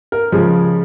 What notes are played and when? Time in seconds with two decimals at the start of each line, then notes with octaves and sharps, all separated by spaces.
0.12 A#4
0.32 C#3 F3 G#3